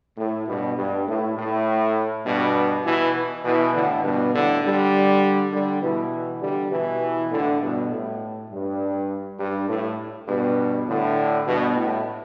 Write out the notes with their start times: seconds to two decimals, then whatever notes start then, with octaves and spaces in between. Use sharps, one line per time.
0.17 A2
0.47 G2 B2
0.76 G2
1.07 A2
1.36 A2
2.26 G2 B2
2.85 B2 E3
3.45 B2 E3
3.74 A2 D3
4.04 G2 B2
4.33 A2 D3
4.63 D3 G3
5.52 D3 G3
5.82 B2 E3
6.41 D3 G3
6.72 B2 E3
7.30 A2 D3
7.60 G2 B2
7.90 A2
8.50 G2
9.39 G2
9.68 A2
10.27 G2 B2
10.87 A2 D3
11.46 G2 B2
11.76 A2